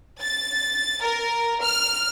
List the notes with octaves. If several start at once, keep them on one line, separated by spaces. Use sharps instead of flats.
A6
A#4
F6